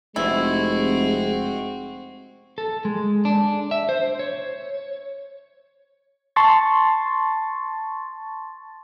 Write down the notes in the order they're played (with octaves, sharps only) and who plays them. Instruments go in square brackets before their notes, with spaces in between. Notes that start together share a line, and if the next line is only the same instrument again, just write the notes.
[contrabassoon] F1 [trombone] G#3 [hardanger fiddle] C4 F#4 [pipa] E4
[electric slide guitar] A4
G#3
D4
E5
C5
C#5
[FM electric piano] A5 C6 C#6 A6